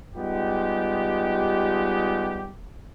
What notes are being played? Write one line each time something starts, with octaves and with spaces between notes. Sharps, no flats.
G3 G#3 B3 D#4 F4 G4